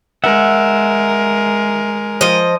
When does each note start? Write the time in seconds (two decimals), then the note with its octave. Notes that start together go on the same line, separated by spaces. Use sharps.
0.24 G#3 A#4 E5 F#5
2.21 F3 D#5